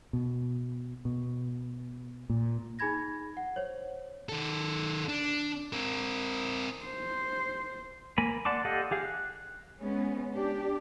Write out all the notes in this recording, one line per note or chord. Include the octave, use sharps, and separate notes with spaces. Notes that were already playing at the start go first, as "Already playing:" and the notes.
B2
B2
A#2
D#4 G#4 G#5 B5 G#6 A#6
F#5
C5 C#5
D#3 A4
D4
C4 A#4
C5
A#3 G#5 B5
D5 F#5 A5 C6 D6
G4 A4 D#5 F5 F#5
G4 G#4 F5
F#6
G#3 B3 C#4
D4 G4